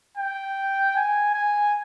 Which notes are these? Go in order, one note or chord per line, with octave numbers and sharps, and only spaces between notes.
G5
G#5
G#5